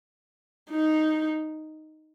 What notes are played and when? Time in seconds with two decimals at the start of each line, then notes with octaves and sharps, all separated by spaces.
0.71 D#4